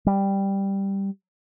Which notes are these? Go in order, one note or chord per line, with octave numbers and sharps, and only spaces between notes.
G3